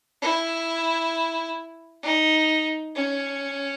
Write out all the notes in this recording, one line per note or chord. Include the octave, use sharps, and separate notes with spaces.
E4
D#4
C#4